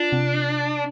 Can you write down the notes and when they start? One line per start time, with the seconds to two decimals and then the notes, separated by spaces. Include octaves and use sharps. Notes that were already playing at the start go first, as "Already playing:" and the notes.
Already playing: D4 F4
0.12 C3